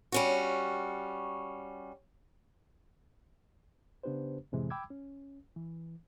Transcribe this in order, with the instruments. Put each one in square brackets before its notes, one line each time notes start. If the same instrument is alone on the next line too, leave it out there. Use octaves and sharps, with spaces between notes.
[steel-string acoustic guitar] G3 C#4 F#4
[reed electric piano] C#3 B3 D4 G4 B4 C5
F2 A2 C3 E3 G#3
G5 B5 D6 E6 G#6
C#4
E3